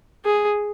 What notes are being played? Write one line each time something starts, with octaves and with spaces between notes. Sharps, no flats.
G#4